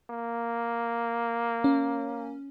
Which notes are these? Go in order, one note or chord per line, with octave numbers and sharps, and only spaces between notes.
A#3
C#4